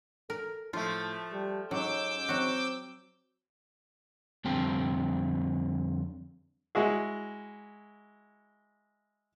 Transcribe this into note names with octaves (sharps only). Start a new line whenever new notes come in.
A4 A#4
A2 F3 A3 F4
G3
G#2 F#3 C#4 D6 E6 G6
F#3 C4 F#4
F2 D3 G3 C4 G5 A5
G#3 E4 F#4 G#4